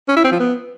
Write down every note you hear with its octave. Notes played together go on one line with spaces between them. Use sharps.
C#4
E4
C4
F3
B3